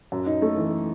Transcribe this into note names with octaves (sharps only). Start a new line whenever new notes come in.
F#2
D#4
A3
E3